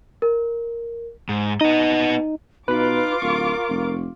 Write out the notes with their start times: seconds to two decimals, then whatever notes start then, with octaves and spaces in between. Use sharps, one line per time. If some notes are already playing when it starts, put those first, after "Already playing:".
0.22 A#4
1.29 G#2
1.61 B3 D#4 D#5
2.68 B2 D#4 F4 B4 B5 D6
3.22 D1 A#4 C#6
3.69 F1